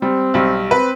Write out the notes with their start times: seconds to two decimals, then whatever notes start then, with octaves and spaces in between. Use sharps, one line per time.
0.02 G3 C4
0.34 B1 G3
0.71 C4 B4